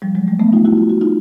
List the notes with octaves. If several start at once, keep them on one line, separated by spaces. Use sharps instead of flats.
F3 G3
F#3 G#3
G3 A3
A3 B3
D#4 F4
E4 F#4
F4
F#4
D#4 F4